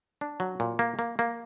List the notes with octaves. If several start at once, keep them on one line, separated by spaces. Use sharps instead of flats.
D4
F#3
A#2
A#3
A#3
A#3